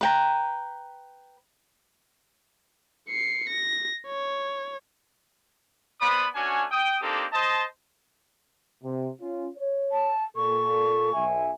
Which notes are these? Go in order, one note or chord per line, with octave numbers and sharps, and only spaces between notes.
B4 G5 A#5
C7 C#7
A#6
C#5
B3 B4 C5 D5 B5 D#6
A3 C#4 D4 F#4 G#5
G5 D#6
A#3 C4 D4 D#4 G4 A4
C5 D#5 A5
C3
C#4 F4
C#5
A5
A#2 A4 C#6
B1 E5 G#5